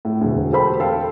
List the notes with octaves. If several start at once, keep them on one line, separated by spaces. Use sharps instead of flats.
A2
E1 D2
G4 A4 C5 B5
A4 F5 G5